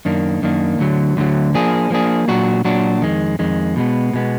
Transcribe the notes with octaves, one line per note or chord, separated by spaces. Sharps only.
F#2 D#3 A#3 D4
F#2 D#3 A#3 D4
D2 D3 F#3
D2 D3 F#3
F3 A#3 D4 G#4
F3 A#3 D4 G#4
A#2 F#3 D4 F#4
A#2 F#3 D4 F#4
F2 D#3 G#3
F2 D#3 G#3
B2 G#3 B3
B2 G#3 B3